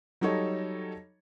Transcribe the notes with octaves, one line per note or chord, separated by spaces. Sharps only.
F#3 G3 D#4 A4 C#5